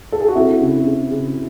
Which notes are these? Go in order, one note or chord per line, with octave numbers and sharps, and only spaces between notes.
A4
G#4
F#4
C4 E4
C#3
C#3
C#3